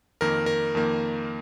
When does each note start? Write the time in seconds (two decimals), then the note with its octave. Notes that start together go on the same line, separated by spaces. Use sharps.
0.21 F2 D#3 A#3 A#4
0.46 A#4
0.75 F2 D#3 A#3